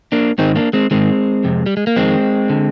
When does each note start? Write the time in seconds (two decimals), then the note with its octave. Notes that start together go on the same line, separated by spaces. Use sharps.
0.12 A#3 D4
0.38 G#2 D#3 C4 D#4
0.56 A#3 D4
0.73 G#3 C4
0.91 G#2 D#3 G#3 C4
1.44 F2 C3
1.66 G3
1.77 G#3
1.87 A#3
1.96 F2 D#3 G#3 C4
2.50 D3